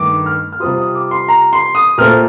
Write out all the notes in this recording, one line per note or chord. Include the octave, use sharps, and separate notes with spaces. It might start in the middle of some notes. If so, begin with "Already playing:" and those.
Already playing: G2 D#3 A3 D6
F6
F6
C3 G3 C4 F4 D#6
D#6
D6
C6
A#5
C6
D#6
A#2 A3 C4 F4 F6